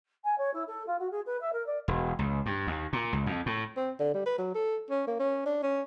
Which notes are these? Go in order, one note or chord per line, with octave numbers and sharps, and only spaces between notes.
G#5
C#5
E4
A4
F4
F#4
G#4
B4
E5
A#4
D5
E1
C#2
G2
D#2
A#2
C#2
F2
A2
C4
D3
G3
B4
F#3
A4
C#4
A#3
C#4
D4
C#4